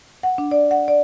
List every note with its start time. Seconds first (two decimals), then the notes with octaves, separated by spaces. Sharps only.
0.23 F#5
0.38 D4
0.51 D5
0.71 F#5
0.88 D5